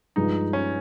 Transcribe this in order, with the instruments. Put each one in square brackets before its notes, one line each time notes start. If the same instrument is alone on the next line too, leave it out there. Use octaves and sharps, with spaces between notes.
[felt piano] G2 F3 G#3 [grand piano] D#4
[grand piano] C#4